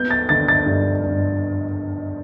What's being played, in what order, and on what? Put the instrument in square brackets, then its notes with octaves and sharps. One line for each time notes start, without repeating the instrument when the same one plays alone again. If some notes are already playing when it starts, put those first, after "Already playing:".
Already playing: [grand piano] B3 G6
A6
D3 A6
A6
G2
G2